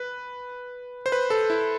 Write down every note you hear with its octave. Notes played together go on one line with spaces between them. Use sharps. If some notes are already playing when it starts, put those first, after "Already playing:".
Already playing: B4
C5
B4
A4
E4